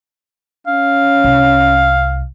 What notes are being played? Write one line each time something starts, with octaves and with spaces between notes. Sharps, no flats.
C#4 F5
C2